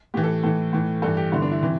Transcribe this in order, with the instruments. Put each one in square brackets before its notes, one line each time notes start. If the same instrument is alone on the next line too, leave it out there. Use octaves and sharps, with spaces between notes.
[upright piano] A2 E3 G4
A4
A2 E3 A4
A2 E3
G2 E3 A4
G4
G2 D3 E4
D4
E4
C3 E3